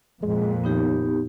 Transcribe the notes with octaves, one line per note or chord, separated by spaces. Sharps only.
F2 A#2 G#3
D#2 B3 D#4 G4